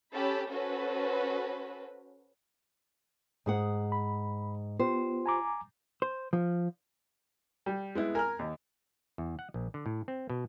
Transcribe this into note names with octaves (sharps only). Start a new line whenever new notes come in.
C#4 G4 A4 A5 B5
C#4 F#4 A4 B4 C5
G#2 G#4 F#5
B5
B3 F4 G4 C5
G#5 A#5 D6
C5
F3
G3
G#3 B3 E4
A#4 G#5 A#5 F6
D#2
E2
F#5
A#1
D3
A2
C4
B2